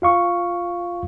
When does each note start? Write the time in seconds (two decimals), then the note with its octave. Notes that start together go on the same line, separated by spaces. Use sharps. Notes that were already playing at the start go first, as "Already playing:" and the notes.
0.02 F4 F5 C#6